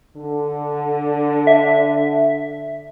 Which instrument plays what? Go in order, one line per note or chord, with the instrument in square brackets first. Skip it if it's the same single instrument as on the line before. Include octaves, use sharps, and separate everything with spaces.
[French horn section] D3
[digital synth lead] E5